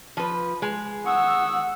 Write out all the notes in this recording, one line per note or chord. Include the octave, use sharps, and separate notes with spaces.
F3 B4
G#3
F#5 C#6 D#6 E6